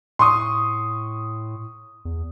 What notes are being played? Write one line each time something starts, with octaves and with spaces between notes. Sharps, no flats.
A2 C6 C#6 D#6
E2